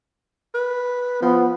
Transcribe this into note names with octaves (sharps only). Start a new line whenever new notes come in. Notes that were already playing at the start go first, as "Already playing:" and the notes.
B4
F3 B3